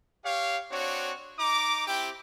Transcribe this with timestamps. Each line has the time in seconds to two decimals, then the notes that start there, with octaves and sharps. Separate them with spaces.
0.25 G4 C#5 F5
0.71 C4 D4 F#4 C#5
1.39 D#4 A#5 D6
1.87 C4 E4 G4 G5 D6